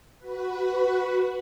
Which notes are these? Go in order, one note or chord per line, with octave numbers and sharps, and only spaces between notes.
F#4 B4